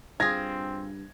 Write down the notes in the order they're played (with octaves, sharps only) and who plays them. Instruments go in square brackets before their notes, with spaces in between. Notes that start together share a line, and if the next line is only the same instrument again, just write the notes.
[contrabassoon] G2 [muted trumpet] C4 [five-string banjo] F4 G#4 [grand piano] G#6 A#6